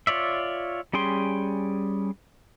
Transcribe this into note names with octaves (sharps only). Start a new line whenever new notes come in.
F4 C#5 D5 E5
G3 C#4 G#4 G5 C6